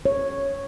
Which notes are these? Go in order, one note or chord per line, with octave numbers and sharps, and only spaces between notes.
C#5